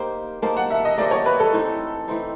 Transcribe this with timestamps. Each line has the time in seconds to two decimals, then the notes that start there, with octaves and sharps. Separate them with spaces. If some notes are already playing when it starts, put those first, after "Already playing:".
Already playing: A#3 D#4 G4 C5
0.42 A#3 D#4 G4 C5 A5
0.57 F#5
0.70 E5
0.85 D#5
0.97 A#3 D#4 G4 C5 D5
1.11 C#5
1.26 B4
1.40 A4
1.53 E3 A3 C4 D#4
2.08 E3 A3 C4 D#4